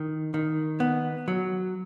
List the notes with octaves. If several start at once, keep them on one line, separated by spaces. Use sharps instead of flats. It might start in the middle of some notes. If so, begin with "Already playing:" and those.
Already playing: D#3
D#3
B3
F#3